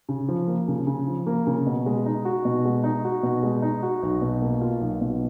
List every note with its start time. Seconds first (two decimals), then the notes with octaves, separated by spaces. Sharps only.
0.09 C#3
0.29 F3
0.48 A#3
0.68 C#3
0.87 C#3
1.08 F3
1.27 A#3
1.47 C#3
1.66 B2
1.86 G#3
2.06 D#4
2.25 F#4
2.45 B2
2.65 G#3
2.84 D#4
3.04 F#4
3.23 B2
3.43 G#3
3.62 D#4
3.83 F#4
4.03 B1
4.22 B2
4.42 A#3
4.61 F4
4.81 B1
5.01 B2